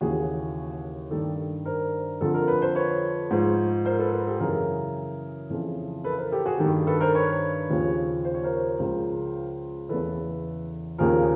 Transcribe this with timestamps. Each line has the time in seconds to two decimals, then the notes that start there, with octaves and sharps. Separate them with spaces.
0.01 D#2 C#3 E3 F#4 G#4
1.11 G2 D#3 G4 A4
1.65 A#4 C5
2.21 F2 D3 F3 A4
2.34 A#4
2.48 B4
2.62 C5
2.75 B4 C#5
3.31 G#2 F3
3.85 A#4 C5
3.99 A4 B4
4.13 A4 B4
4.27 G4 A4
4.40 F#2 C#3 E3 G#4 A#4
5.50 F2 C#3 E3
6.04 A4 B4
6.18 A#4 C5
6.32 G4 A4
6.46 F#4 G#4
6.59 G2 D#3 G4 A4
6.87 A4 B4
7.00 A#4 C5
7.14 B4 C#5
7.70 D#2 C#3 F3
8.25 C5
8.34 C#5
8.44 A#4 C5
8.79 C#2 C#3 F3
9.89 E2 C#3 E3 A4 B4
10.98 D#2 C#3 F3 G#4 A#4